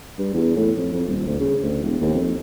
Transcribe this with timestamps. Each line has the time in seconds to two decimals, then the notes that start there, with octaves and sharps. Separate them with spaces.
0.19 G2
0.34 E2
0.56 A2
0.77 F2
0.93 F2
1.07 D#1
1.26 D2
1.40 C#3
1.63 D2
1.83 E1
2.01 D#2
2.14 F2